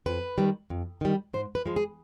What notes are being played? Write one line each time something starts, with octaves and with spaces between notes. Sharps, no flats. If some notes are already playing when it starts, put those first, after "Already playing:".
F2 B4
D#3 G3
F2
D#3 G3
G#2 C5
B4
F3 G#3
G#4